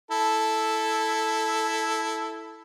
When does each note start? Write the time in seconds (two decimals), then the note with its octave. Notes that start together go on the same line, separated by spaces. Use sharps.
0.11 E4 A4